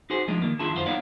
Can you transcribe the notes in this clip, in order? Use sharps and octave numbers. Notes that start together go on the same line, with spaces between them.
D#4 F#4 G#4 C5
F3 G#3 A3 D4 D#4
D#3 A#3
D#3 D4 E4 F4 G#4 A5
F#2 D#3 E4 F4 C5
B3 D#4 E4 C#5 D5 F5